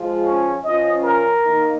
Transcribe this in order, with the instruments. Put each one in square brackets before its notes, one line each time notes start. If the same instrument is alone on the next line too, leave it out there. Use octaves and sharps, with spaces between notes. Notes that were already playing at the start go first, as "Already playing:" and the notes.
Already playing: [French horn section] F3 G#3 F4
[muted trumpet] C#4
[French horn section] F3 C#4 F4 [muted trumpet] D#5
[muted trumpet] A#4
[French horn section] D#3 A#3 D#4